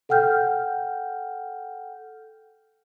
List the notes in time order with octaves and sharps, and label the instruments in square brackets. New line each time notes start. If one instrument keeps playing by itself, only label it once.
[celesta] A4 F#5 G5 F6 G6